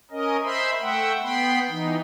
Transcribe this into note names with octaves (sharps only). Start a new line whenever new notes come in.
C#4 A#4 D#5
C5 E5 B5 C6
A3 E5 F#5 G5
B3 G5 B5 C6
E3 D#4